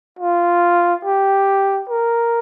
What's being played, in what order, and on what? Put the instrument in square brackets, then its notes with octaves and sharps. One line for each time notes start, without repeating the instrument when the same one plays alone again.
[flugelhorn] F4
G4
A#4